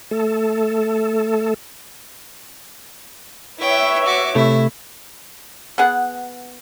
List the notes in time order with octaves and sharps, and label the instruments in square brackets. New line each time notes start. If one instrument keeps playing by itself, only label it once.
[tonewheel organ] A3 A4
[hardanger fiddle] E4 G5 [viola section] B4 C#5 E5
[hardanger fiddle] F#4 D6
[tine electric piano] C3 A3 [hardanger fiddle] E4
[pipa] B3 G#4 F#5